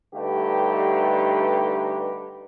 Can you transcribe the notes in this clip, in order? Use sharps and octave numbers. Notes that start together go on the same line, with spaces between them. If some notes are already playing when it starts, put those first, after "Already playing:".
G2 D3 A3 D#4 G4 B4